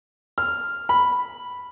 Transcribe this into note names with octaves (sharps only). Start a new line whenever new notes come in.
F6
B5